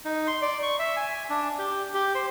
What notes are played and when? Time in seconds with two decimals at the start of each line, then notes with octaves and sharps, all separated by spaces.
0.05 D#4
0.27 C6
0.42 D5
0.63 C#6
0.79 E5
0.96 G#5
1.30 D4
1.59 G4
1.94 G4
2.15 C5